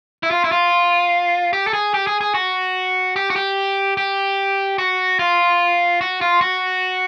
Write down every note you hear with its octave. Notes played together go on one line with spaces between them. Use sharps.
E4
F4
E4
F4
G4
A4
G#4
G4
G#4
G#4
F#4
G4
F#4
G4
G4
F#4
F4
F#4
F4
F#4